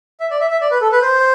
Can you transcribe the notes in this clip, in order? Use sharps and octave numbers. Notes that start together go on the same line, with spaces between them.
E5
D5
E5
E5
D5
B4
A4
B4
C5